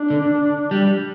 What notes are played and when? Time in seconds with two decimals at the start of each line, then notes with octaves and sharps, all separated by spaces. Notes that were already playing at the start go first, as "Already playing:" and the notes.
Already playing: D4
0.10 D3
0.71 G3